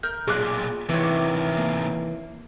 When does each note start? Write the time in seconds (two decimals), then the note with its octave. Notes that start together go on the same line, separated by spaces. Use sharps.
0.03 A#4 G6
0.27 B1 A#2 G#4 C6 D6 F#6
0.89 C3 D#3 E3 E4 C#5 D6
1.58 A#3